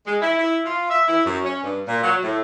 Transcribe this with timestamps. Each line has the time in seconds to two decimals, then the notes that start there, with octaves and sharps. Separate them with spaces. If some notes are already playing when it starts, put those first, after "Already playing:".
0.07 G#3
0.22 E4
0.38 E4
0.65 F4
0.90 E5
1.08 E4
1.25 F#2
1.45 C#4
1.63 G2
1.88 A#2
2.03 F#3
2.24 A2